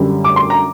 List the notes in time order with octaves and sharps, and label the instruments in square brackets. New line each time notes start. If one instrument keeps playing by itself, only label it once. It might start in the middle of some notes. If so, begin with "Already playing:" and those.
Already playing: [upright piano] F#2 D3 G3
D6
C6
A#5